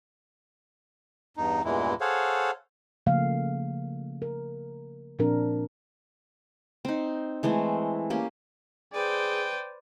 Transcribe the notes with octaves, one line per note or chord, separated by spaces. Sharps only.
E2 G2 D#4
E2 G2 A#2 E3 G#3 E4
G#4 A4 C5 C#5 F5 F#5
C#3 F3 A3 A#3 F5
A#4
A#2 F3 C4 D4 A#4
C4 D#4
E3 G#3 A3 C4
A#3 C#4 G4
G#4 B4 C5 D5 G5